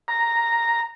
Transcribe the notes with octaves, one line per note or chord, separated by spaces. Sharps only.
A#5